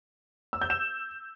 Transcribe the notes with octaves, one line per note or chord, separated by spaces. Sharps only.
E6
G6
E7